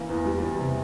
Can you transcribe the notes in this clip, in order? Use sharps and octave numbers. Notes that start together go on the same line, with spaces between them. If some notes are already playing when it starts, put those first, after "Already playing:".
Already playing: E3 A#3
E2
G3
E2
C3